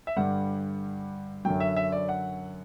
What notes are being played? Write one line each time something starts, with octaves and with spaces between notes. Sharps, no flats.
E5
G2 D3 G3 F#5
F#2 D3 F#3 G5
E5
E5
D5
F#5